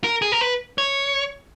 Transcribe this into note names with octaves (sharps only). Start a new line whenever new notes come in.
A#4
G#4
A#4
B4
C#5